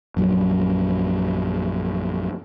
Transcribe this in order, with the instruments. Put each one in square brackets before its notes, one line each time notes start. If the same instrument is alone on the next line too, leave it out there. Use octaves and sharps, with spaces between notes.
[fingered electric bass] A#1 F#2 F#3